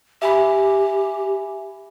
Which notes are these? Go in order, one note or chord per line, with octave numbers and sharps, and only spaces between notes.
G4 E5 G#5 B5